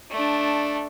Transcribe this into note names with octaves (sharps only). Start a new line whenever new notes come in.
A3 D4